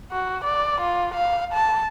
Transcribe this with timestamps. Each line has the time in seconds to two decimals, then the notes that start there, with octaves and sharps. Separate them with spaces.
0.12 F#4
0.44 D5
0.81 F4
1.14 F5
1.53 A5